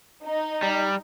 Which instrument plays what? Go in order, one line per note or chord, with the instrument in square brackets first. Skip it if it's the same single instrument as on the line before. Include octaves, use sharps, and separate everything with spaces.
[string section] D#4
[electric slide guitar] G3